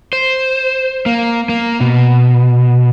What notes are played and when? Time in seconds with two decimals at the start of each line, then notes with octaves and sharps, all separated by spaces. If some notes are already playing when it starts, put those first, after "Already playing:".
0.13 C5
1.06 A#3
1.49 A#3
1.80 B2